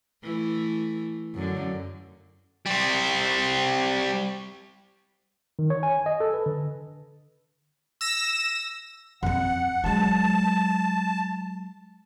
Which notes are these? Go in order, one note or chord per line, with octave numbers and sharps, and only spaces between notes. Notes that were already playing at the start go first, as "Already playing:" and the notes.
E3 A3
F#2 D3
G3 C4
D#3
C#5
G#5
D#5
A4
B4
D3
E6 A#6 E7
F2 C4 F#5
F#3 G#3 A5